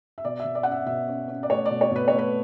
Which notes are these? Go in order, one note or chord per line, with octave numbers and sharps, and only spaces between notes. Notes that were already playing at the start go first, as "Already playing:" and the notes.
E5
B2 D5
B2 E5
D5
C#4 F#5
E5
B2 E5
C#4
C#4
D5
A3 C#5
D5
B2
C#5
B2 B4
A3 C#5
B4